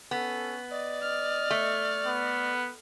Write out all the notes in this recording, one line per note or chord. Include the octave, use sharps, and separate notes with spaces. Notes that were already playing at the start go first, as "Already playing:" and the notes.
B3 C#4 A4
D5 D#5
D#5 F6
A3
B3